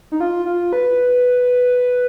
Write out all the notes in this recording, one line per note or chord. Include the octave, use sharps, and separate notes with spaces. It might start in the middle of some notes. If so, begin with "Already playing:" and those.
D#4
F4
F4
B4